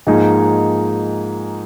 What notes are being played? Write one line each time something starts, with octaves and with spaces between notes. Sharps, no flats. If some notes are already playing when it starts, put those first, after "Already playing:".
G#2 F3 A#3 D#4 G#4